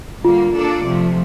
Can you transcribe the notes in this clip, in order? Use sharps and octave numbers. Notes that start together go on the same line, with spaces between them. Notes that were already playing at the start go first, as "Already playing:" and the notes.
D3 G3 A#3 F4
A#3 D4 A4 D5
C3 F3 A3